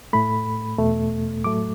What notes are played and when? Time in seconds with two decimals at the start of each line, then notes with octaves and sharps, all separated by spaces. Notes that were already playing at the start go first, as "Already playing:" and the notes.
0.13 A2 A3 B5
0.79 E2 B2 A3
1.44 A2 F#3 A3 D6